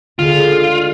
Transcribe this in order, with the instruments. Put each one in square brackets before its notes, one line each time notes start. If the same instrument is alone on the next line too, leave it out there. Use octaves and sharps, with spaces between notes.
[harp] D2 D3 G#3 [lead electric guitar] F4